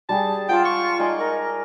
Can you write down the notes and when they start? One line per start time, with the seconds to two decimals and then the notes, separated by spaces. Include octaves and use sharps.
0.09 G3 G4 G#4 A5
0.49 F4 F#5 G5 A5 D6
0.65 C#6
0.99 D#4 D5 G#5
1.18 A#4